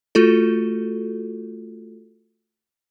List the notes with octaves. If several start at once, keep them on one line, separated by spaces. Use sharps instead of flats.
A3 F4 F#4 A4